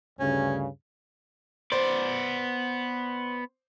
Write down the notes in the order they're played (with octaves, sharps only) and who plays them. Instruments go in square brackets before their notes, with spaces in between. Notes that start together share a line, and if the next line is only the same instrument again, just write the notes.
[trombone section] D2 G2 C#3 [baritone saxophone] C#4
[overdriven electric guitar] B3 D5 [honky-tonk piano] C5